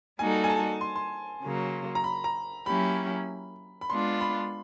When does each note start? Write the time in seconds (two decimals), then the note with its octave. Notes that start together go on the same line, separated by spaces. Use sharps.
0.19 G3 A#3 D#4 F#4 A4 G#5
0.44 G#5
0.50 A5
0.81 C6
0.96 C6
1.43 C#3 F#3 A#3
1.95 A#5
2.04 B5
2.24 A#5
2.66 F#3 A#3 C#4 E4 G4 B5
3.81 B5
3.90 G#3 B3 D4 F4 C6
4.21 B5